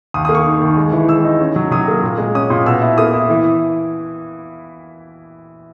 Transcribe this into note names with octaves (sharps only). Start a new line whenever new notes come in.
D#2 D#6
D#6
A#3
C#6
D#3
D#2
G#3
E3
G#3 E6
D#4
C#4
F#3
F#3 D#6
A#3
A#2
G#3
C#4 D#6
A#2 D#6
B2 E6
E4
A#3 D#6
E4
E3